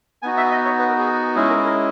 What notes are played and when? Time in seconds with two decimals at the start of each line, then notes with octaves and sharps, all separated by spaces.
0.22 B3 D#4 F#4 G#5
0.37 E5
0.51 D#5
0.65 C#5
0.79 B4
0.89 A#4
0.98 G#4
1.36 G#3 C#4 E4 G#4
1.49 A#4
1.65 A#4